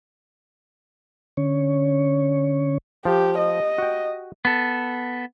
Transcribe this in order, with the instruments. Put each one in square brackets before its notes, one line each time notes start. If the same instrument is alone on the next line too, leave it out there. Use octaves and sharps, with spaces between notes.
[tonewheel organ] D3 C#4 C#5
[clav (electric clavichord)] F3 [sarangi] G4
[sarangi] D#5
[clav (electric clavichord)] F#4 G5
[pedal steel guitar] B3 A4